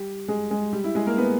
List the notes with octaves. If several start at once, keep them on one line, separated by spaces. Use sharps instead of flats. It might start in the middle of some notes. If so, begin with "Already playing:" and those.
Already playing: G3 G4
G#3 G#4
G#3 G#4
G3 G4
E4
G#3 G#4
A#3 A#4
B3 B4